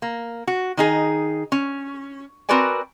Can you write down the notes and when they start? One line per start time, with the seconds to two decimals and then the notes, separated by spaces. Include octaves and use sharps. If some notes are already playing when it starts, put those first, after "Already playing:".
0.02 A#3
0.47 F#4
0.77 D#3 D#4 G#4
1.52 C#4
2.49 C4 F#4 A#4 B4 D5 G#5